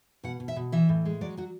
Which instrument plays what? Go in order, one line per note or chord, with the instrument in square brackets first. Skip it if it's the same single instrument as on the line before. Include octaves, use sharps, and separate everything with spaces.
[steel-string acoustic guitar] B2 F#5
B2
E5
B2
E3 E5
A2
G#3
F#3 D5
F#3 F#4